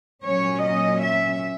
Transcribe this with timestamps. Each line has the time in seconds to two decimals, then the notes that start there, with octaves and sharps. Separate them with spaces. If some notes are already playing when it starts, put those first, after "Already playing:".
0.24 A#2 F#3 C#4 C#5
0.62 D#5
1.02 E5